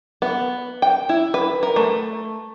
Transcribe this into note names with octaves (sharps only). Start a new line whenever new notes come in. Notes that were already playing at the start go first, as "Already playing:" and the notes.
B3
G5
E4
B4
A#4
A3